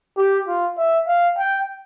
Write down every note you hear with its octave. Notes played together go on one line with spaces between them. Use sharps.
G4
F4
E5
F5
G5